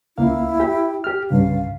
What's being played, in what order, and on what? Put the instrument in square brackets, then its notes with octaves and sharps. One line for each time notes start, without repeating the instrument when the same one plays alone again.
[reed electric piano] C#2 A#3 F5 [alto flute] E4
[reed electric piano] G4 G5
G4 F6
[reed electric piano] C2 G2 C#3 [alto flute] F5